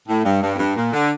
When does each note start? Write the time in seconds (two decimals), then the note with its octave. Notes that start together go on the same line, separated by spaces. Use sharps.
0.08 A2
0.25 G2
0.42 G2
0.55 F2
0.59 G2
0.76 A#2
0.93 D3